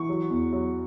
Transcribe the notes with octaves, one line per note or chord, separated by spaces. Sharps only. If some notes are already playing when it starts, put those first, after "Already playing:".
Already playing: E3 C#6
F#3
E2
F#3